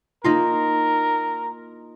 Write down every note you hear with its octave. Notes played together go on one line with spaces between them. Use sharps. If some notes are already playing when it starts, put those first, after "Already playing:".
A#3 D#4 F4 A#4